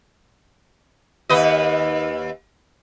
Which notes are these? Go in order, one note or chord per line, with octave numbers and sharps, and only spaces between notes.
D#2 B4 D#5